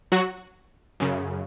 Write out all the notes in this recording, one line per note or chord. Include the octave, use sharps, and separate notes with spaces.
F#3 F#4
F#2 C#3